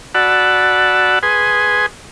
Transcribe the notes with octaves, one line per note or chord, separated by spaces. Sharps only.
F#4 D5 F#5 A5 B5 E6
G#4 B4 G#5 C6 D#6